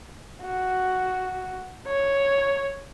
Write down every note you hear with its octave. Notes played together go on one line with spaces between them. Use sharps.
F#4
C#5